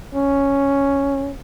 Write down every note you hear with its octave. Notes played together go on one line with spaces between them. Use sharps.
C#4